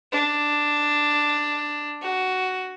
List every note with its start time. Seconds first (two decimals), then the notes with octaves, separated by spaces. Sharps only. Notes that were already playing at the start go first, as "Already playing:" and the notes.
0.12 D4
2.02 F#4